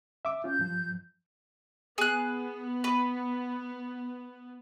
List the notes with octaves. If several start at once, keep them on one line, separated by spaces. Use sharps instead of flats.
E5 D6
C#4 F4 G6
G2 F3
B3 G#4 F#6
B4